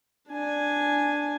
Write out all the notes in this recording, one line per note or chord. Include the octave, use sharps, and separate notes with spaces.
D4 G#5